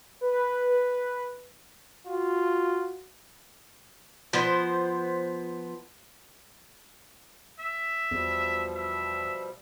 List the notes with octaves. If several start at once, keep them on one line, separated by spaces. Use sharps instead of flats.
B4
F4 F#4
F3 B3 C5
E5
E2 B2 F3 G3
E5